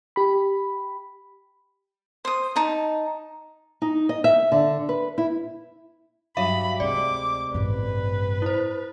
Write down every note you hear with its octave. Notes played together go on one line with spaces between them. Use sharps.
G4 B5
C5 D#6
D#4 A5
D#4
D#5
E5
D3
B4
E4
G2 F#3 E5 F5 B5
D2 C3 G#3 D5 D6
A1 G2 B4
E4 C5